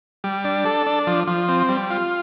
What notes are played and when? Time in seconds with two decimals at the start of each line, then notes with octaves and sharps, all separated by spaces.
0.24 G3
0.45 D4
0.65 A4
0.86 D4
1.07 F3
1.27 F3
1.48 C4
1.69 G3
1.90 F4